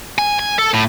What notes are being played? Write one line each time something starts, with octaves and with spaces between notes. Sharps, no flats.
G#5
G#5
A4
A2